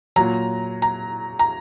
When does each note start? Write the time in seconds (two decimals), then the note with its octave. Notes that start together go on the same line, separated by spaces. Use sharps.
0.16 A#2 F#3 A#5
0.82 A#5
1.39 A#5